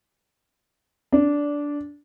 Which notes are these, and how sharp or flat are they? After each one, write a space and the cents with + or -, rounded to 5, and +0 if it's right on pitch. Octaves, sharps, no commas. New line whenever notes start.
D4 -15